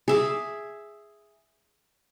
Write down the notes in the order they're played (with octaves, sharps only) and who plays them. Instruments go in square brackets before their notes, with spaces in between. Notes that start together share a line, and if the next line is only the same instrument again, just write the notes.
[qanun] G#4 E5 D6